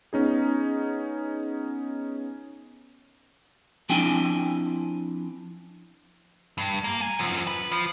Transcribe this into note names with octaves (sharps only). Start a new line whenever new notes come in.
B3 C#4 D#4 G#4
F3 C4 D4 E4 G5 G#5
G2
A#3
G#5
F#2 F3
B4
F3